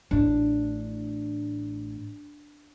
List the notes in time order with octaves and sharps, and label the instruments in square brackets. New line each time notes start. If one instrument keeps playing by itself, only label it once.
[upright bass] A1 A2 [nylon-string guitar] D4